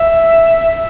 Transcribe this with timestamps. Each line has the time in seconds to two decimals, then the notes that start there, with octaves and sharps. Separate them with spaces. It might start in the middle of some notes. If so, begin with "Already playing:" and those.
Already playing: E5